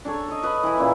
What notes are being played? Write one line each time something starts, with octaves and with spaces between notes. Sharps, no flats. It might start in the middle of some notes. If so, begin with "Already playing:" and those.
D4 A4 C#5
C#5 D#5
B4 D#5 B5
E3 E4
A#2 C#4 E4 G#5